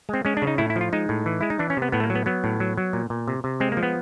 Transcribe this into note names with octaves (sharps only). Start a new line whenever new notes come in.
G#3 C4
G#3 C#4
D4
C#3
D#4
A2 E4
E4
F3
F4
G#3 D#4
A2
E3
G#3 E4
D#4
E3 D4
C#4
C3
B3
A2 B3
A3
A#3
F#3
B3
F#3 B3
A2
F#3
F#3
A#2
A#2
C3
C3
G#3 C4
A#3
F3
B3